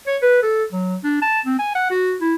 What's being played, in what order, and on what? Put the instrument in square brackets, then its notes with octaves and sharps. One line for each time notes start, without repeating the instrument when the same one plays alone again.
[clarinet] C#5
B4
A4
F#3
D4
A5
C4
G#5
F#5
F#4
E4